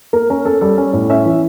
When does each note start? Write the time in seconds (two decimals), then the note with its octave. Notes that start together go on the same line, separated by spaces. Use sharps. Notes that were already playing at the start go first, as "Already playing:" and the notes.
0.13 A#3 A#4
0.30 C#4 A#4
0.45 C#4 A4
0.61 G3 A4
0.78 C#4
0.93 A2
1.10 C#4 E5
1.25 E3